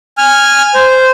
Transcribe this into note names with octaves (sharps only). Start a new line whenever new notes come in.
G#5 F6
C5